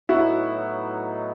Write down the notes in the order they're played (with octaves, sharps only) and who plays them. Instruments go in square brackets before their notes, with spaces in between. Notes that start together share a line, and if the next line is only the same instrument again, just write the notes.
[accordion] A2 F#3 B3 D#4 [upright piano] E4 F#4